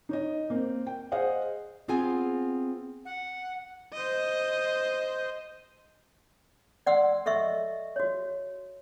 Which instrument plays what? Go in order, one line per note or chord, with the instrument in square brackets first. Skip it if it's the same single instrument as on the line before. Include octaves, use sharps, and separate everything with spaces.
[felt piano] D#4 C#5 D#5
A#3 C4
G5
G#4 C5 D#5 F5 F#5
[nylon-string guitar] B3 C4 F4 G#4 F#5 G#5
[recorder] F#5
[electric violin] C5 D#5
[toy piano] D5 F#5 C6 E6
A4 D#5 E5 C#6 E6
F#4 C#5